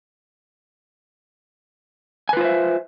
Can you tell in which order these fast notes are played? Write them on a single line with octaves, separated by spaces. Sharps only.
G#5 B4 F4 C5 E5